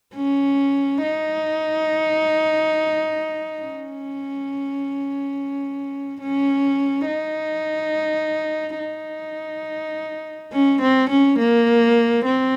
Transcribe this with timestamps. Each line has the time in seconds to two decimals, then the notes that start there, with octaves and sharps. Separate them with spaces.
0.15 C#4
1.02 D#4
3.61 C#4
6.21 C#4
7.07 D#4
8.79 D#4
10.52 C#4
10.81 C4
11.09 C#4
11.39 A#3
12.25 C4